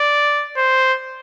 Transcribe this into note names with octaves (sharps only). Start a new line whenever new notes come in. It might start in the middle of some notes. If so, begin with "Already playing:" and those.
Already playing: D5
C5